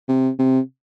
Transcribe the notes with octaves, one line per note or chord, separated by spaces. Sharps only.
C3
C3